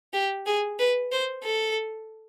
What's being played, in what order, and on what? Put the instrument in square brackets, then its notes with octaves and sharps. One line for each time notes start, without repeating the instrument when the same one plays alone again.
[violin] G4
G#4
B4
C5
A4